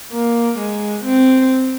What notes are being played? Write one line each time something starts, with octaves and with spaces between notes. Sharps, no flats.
A#3
G#3
C4